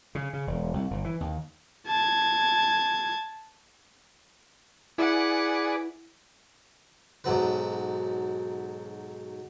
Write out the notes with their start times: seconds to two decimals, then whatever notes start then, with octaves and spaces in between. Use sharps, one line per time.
0.15 C#3
0.33 C#3
0.47 E1
0.73 C2
0.90 G1
1.04 E3
1.20 D#2
1.88 A5 G#6
4.98 E4 G#4 B4 D5 F#5
7.24 B1 G#2 F#3 B4